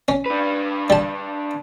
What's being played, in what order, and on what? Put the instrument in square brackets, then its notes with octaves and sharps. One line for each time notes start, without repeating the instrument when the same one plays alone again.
[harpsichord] C#4
[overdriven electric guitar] D4 B4
[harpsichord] G3 A5